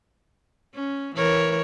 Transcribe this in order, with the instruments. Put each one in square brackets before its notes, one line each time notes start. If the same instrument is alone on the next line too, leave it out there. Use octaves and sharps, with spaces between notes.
[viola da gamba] C#4
E3 A#4 C#5